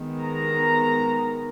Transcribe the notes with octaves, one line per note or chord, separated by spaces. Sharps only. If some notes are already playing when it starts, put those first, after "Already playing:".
Already playing: D#3 G#3 B3
A#5